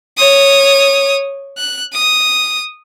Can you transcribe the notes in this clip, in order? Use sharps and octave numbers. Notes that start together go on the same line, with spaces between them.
C#5 D#6
F#6
D#6